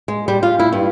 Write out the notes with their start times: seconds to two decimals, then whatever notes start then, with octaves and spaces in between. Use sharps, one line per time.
0.08 G#3
0.28 G3
0.43 F4
0.59 E4
0.73 G2